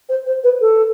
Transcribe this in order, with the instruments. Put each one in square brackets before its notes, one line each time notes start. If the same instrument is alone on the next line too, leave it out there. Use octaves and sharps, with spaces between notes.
[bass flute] C5
C5
B4
A4